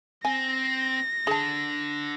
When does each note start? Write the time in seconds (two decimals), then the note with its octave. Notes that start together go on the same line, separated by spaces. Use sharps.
0.25 C4 G#5 A#6
1.27 D3 G#4 A5